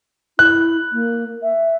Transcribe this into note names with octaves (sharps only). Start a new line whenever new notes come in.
E4 F#6
A#3
E5